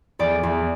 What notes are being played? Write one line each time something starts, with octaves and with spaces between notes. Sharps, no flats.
E2 D5
E2